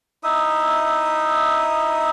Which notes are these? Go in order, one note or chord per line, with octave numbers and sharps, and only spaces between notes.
D#4 E4 E5 D#6